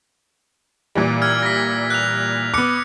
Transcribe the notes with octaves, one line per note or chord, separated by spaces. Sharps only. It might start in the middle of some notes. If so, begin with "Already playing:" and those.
A#2 E3 G3
E6 F6 G#6
A#6 B6
F#6 F7
B3 D6 F#6 C#7